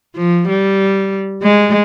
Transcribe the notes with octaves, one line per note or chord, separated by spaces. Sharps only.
F3
G3
G#3